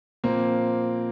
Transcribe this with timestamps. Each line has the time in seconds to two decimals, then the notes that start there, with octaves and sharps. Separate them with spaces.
0.24 A#2 F3 A#3 C4